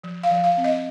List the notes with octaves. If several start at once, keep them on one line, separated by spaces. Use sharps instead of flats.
F3
F5
F3
F5
C4
D#5